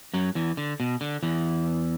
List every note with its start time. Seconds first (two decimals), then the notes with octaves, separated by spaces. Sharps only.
0.14 F#2 F#3
0.35 E2 E3
0.57 D3
0.80 B2
1.01 D3
1.23 E2 E3